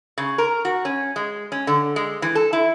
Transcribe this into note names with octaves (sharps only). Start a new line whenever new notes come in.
C#3
A#4
F#4
C#4
G#3
C#4
D3
G#3
E3
A4
E4